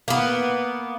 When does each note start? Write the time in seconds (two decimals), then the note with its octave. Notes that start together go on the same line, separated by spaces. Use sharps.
0.08 A#3 B3